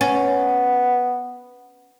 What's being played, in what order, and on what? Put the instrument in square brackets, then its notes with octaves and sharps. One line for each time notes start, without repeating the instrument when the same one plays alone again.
[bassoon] B3 [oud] C#4